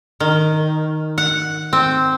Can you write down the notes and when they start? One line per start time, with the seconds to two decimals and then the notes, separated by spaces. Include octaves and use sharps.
0.20 D#3
1.18 F#5
1.73 C4